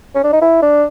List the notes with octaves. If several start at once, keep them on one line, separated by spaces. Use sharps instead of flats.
C#4
D4
D#4
E4
D4